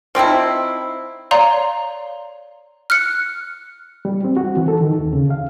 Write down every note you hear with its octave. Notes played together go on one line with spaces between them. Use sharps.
F3 C4 D#4 E4
C#5 D5 F5 A#5 C6
F6 F#6 C#7
G3
C4
F#4
E3
A4
D#3
D#2
C#3
F5